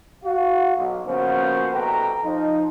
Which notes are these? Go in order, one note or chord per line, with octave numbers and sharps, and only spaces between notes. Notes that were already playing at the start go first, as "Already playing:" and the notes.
F#4 F5
B1
C#3 F3 A#3 B3 F#4 C5
C2 B2 A4 B4 G5 A#5
F3 D#4